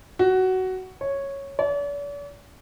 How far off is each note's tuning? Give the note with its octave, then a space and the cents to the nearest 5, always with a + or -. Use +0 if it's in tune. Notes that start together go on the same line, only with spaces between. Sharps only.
F#4 +15
C#5 -5
D5 -45